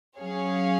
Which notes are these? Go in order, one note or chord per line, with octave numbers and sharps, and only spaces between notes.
F#3 C#4 G#4 C#5 F5